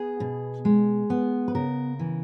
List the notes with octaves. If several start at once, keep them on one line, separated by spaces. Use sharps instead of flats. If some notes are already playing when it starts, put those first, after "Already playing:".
Already playing: B3 G#4
B2
G#3
B3
B4
C#3 A#4
E3